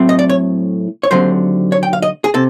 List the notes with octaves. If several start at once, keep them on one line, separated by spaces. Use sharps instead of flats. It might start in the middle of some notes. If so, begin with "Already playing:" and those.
Already playing: A2 F#3 A3 C4
D#5
D5
C#5
C#5
D#2 D3 F#3 A3 C4 C5
C#5
G5
F5
D#5
G#4
C3 A4